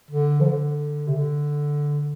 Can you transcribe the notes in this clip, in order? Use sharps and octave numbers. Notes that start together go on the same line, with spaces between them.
D3
F3
D3
C3
D3